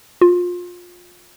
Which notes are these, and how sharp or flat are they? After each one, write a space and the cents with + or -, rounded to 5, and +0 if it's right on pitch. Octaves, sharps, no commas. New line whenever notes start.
F4 +25